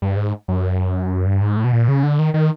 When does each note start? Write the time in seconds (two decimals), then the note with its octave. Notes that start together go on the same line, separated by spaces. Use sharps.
0.02 G2
0.17 G#2
0.48 F#2
1.26 G2
1.41 G#2
1.57 A2
1.64 B2
1.73 A#2
1.88 C#3
2.03 D3
2.19 D#3
2.34 D#3